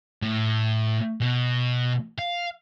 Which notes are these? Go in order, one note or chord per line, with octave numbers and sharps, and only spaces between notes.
A2
B2
F5